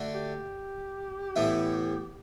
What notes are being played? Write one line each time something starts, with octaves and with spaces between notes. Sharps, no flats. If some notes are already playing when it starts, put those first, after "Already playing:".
Already playing: D3 A3 D4 F#4
G4
A2 E3 B3 E4